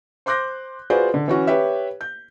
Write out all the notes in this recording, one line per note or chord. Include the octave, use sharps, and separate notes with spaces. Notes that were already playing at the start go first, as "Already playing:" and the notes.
C5 C6 D6 F#6 G6 A#6
F4 F#4 G#4 B4 C5 D5
D3
E3 C#4 F#4
G4 B4 C#5 E5
G6